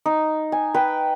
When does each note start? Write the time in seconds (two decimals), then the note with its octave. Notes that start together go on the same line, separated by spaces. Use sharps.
0.06 D#4
0.52 G#5
0.74 B4 G5